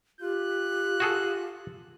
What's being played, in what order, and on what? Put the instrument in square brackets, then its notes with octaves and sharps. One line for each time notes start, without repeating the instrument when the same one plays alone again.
[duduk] F4 [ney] G4 [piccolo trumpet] F#6
[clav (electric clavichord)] F#4 G#4 A4